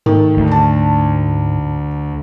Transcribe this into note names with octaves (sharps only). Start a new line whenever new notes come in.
G#2 D#3 A3
D2
A5